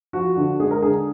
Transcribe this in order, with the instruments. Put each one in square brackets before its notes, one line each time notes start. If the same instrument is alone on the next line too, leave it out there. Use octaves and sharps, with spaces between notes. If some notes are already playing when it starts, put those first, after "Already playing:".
[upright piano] F3 F#4
D3
G#3 G#4
A#4
D3 G#4